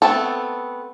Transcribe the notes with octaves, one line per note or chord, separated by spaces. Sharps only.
A3 B3 C4 A4